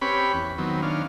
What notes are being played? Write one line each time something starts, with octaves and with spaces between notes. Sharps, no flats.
C4 C#4 G4 B4 C#5 B5
E2
D#3 F#3 B3 C4
D#3 C#4 D4 F5